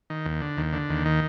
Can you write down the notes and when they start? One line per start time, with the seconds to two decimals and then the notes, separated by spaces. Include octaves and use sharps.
0.10 D#3
0.25 D#2
0.41 D3
0.57 D#2
0.73 D3
0.89 D#2
1.05 D#3